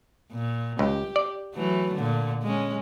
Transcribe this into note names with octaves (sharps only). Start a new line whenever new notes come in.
A#2
C#2 G4
D5
E3 F#3 A3
A#2 D3
G#3 C#4